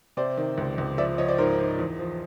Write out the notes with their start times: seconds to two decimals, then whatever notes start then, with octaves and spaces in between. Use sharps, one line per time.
0.17 C3 C5 D5
0.37 D#3
0.58 C#2
0.78 C#2
0.98 F3 D5 E5
1.18 F3 C#5 D#5
1.28 C5 D5
1.38 G#2 A#4 C5
1.59 G#2
1.79 E2
1.99 F3